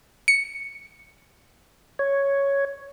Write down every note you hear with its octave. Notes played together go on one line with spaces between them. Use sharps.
C#7
C#5